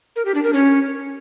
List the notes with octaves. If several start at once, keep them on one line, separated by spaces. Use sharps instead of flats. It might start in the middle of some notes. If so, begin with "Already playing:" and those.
A#4
G4
D4
A#4
C#4